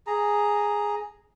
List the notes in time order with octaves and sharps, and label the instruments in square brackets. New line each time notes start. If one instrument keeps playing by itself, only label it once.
[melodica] G#4 A#5